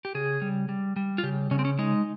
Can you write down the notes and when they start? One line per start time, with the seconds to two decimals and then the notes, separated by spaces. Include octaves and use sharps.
0.05 G4
0.15 C#3 G#4
0.42 G3
0.69 G3
0.96 G3
1.18 F4
1.23 C#3 G4
1.51 C#3 C#4
1.59 C4
1.65 C#4
1.78 G#3 D#4